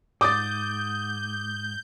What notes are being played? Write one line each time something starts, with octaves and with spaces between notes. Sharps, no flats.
G#2 D6 D#6 G6 A6